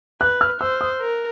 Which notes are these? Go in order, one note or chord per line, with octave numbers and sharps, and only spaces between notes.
B4 F#6
F6
C5 E6
D#6
A#4